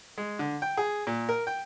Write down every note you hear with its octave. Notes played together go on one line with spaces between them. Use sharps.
G#3
D3
G5
G#4
A#2
A#4
G5